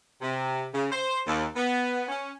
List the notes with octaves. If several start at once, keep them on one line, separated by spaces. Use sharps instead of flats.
C3
C#3
C5
D#2
B3
C#4